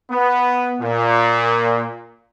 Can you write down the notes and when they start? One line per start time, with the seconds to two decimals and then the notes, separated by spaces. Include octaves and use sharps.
0.10 B3
0.80 A#2